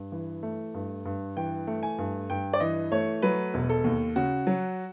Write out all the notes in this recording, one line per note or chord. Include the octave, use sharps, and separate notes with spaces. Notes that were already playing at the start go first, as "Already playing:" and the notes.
Already playing: G2
E3
A3
G2
G2
E3 G5
A3
G#5
G2
G2 G5
D5
E3 D#5
A3 C#5
F#3 B4
E1
A4
D#2
C#3 F#4
F#3